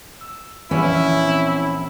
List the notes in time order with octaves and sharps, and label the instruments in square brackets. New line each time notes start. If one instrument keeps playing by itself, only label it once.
[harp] E6
[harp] A#1 E3 D5 [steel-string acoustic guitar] C#4 [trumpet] E4
[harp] C4